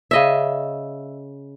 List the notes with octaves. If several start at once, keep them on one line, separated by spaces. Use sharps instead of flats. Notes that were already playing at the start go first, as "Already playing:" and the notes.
C#3 D#5 E5